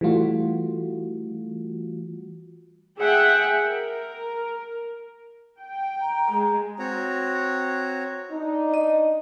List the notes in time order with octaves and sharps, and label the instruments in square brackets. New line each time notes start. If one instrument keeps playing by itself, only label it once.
[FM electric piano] E3 G3 A3 F4 F#4
[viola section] G#4 E5 F#5 G5
A#4
G5
[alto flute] A#5
[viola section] G#3
[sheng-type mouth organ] C4 F#4 C#5 A#5
[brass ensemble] D4 D#4
[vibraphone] D#5